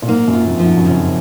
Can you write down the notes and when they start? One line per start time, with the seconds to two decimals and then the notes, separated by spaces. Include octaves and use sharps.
0.02 A#2
0.08 G#2 A#3
0.28 F#2
0.33 F4
0.47 F2
0.59 F3
0.65 G#2
0.77 F#2
0.85 C#3
0.90 F2